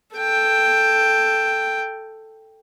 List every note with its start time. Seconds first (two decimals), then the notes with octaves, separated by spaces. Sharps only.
0.17 A4 G5